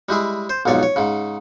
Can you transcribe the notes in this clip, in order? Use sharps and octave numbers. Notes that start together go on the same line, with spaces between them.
G3 G#3 E4 G#4
C5
B1 F2 G#2 C#5 D5
C#5
G#2 C#3